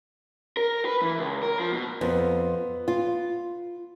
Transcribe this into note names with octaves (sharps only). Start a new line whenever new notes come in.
A#4
B4
E3
C#2
A#4
F3
B2
F2 B3
F4